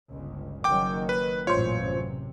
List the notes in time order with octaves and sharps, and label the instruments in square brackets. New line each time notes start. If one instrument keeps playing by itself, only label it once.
[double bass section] G1 C#2
[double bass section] F#1 D#3 F#3 [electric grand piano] G5 D6
[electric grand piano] B4
[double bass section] A1 F#2 A#2 [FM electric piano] F4 C5 [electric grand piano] C#5
[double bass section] C3